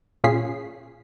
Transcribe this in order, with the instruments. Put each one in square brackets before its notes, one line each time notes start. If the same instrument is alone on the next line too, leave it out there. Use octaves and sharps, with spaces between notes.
[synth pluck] A#2 C#4 F4 G#4 B6 C7